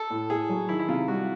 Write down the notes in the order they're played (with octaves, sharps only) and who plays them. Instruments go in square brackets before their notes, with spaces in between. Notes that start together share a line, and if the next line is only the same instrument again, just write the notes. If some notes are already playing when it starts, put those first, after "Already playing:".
Already playing: [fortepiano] A4
[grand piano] A2
[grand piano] A2 [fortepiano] G#4
[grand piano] F#3
[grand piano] D#3 [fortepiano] E4
[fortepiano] E4
[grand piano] C3 [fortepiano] F4
[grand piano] G3 [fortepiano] F#4